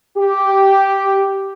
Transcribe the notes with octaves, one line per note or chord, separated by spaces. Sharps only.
G4